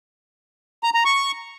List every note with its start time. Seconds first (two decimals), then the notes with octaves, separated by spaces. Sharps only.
0.83 A#5
0.94 A#5
1.05 C#6